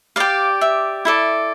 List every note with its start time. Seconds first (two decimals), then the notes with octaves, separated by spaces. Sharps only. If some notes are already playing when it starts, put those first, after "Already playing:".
0.16 G4 D5 F5
0.61 E5
1.05 E4 A4 D5